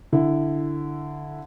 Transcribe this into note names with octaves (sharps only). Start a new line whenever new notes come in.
D3 E4